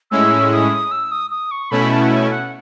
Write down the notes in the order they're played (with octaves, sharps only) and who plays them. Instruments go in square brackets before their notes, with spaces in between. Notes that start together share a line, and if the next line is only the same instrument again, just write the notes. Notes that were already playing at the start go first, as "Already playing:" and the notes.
[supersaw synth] A2 G#3 C#4 E4 [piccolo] E6
[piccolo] D#6
E6
D#6
D#6
C#6
[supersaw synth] B2 A3 C#4 E4 [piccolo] B5
[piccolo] A5
F#5
G#5
F#5